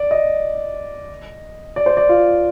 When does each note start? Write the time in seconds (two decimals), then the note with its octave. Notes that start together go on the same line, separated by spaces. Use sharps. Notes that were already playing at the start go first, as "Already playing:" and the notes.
Already playing: D5
0.11 D#5
1.76 D5
1.86 C5
1.97 D5
2.09 F4